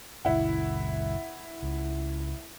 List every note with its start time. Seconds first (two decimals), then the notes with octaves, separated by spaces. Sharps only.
0.25 F#1 C#2 E4 F#5
1.62 C#2